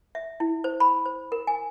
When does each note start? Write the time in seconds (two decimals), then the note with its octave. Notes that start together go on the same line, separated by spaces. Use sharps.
0.15 E5
0.40 E4
0.64 C5
0.80 B5
1.06 C5
1.32 A#4
1.47 G#5